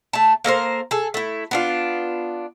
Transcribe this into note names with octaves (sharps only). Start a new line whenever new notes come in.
A3 A5
A#3 A4 A#4 C5
G#4 A4
A3 E4
B3 D4 F4